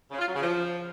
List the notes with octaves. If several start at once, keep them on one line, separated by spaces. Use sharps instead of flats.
C#3
F4
F#3
C#3
F3